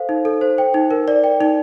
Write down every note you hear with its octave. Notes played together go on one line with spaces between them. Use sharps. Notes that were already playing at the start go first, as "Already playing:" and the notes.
Already playing: A4 C5 F5
D#4
A4
C5
G5
D#4
A#4
D5
G5
D#4